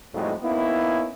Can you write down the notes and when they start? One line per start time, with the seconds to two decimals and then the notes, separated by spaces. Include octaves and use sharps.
0.14 F2 A2 G3 G#3 D#4 F#4
0.43 A#3 B3 C#4 D#4 E4